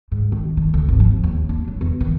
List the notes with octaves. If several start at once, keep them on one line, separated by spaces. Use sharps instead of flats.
G#2
D#3
D#3
D2
G#1
F3
D#2
D4
F#3
E2
D#3